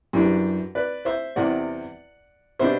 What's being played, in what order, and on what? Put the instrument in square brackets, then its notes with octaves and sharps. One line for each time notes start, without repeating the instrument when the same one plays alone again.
[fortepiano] F#2 E3 G3 D4
B4 D5
C5 E5
E2 C3 G3 C4 D5 F#5
B2 G3 B3 D4 C5 E5